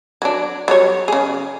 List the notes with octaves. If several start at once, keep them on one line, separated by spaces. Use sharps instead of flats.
F#3 D4
F#3 G3 C#5
C#3 G#4